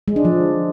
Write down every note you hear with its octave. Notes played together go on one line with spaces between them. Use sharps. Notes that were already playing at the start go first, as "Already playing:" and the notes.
G#3
D4
F3